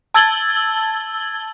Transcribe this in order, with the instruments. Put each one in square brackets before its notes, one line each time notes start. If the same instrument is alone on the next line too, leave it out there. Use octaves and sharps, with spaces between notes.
[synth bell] A5 E6 G#6 A6 F#7 G7